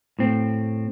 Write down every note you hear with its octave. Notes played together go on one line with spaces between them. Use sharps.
A2 C4